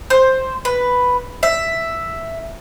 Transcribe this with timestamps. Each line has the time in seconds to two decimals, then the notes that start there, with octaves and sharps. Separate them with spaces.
0.10 C5
0.65 B4
1.43 E5